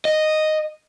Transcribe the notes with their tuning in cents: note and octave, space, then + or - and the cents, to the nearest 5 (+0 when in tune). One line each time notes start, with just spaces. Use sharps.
D#5 -5